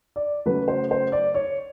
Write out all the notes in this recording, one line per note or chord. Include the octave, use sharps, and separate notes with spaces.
D5
C#3 F#3 A3 B4
C5
C5
D5
C#5